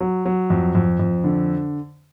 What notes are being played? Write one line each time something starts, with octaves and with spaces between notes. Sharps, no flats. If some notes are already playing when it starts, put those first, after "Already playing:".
F#3
F#3
F2
F2
F2
D3